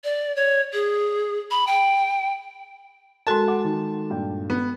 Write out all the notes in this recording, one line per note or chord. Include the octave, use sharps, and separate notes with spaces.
D5
C#5
G#4
B5
G5
G#3 F#4 A4 A#4 A5 C6
F#5 D6
D#3
G2 A#2 G5
B3